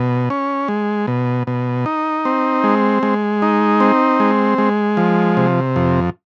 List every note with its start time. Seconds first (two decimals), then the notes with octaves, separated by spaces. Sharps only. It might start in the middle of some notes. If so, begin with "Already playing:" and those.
Already playing: B2
0.30 C#4
0.68 G#3
1.07 B2
1.47 B2
1.86 D#4
2.25 C4
2.64 G#3
3.03 G#3
3.42 D#4
3.80 C4
4.20 G#3
4.58 G#3
4.97 F3
5.37 C3
5.76 F2